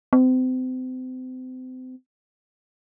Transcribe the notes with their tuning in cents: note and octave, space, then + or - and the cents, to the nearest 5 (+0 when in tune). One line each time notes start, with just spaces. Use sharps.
C4 -35